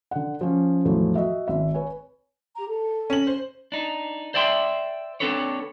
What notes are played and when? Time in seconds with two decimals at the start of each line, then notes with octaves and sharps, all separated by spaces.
0.11 D3 F#5
0.41 F3 C#4
0.85 E2 A2 F3 F#3
1.16 F#4 D#5 E5
1.48 G#1 E5
1.74 B4 C#5 G#5
2.56 G4 A#5
2.67 A4
3.10 C#4 F#7
3.27 C5
3.72 D4 D#4
4.34 C5 D5 E5 G5 C6
5.20 C4 D4 A4 B4 C#5